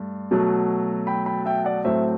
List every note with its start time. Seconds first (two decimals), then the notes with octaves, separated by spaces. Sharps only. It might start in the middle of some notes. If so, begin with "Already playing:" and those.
Already playing: G2 A3
0.31 B2 F#3 A3
1.07 G5 B5
1.26 G5 B5
1.46 E5 G5
1.65 D5 F#5
1.84 A2 F#3 A3 C4 C5 E5